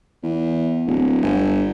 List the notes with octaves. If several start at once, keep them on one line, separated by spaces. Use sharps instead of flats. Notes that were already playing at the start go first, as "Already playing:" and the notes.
E2
D1
G1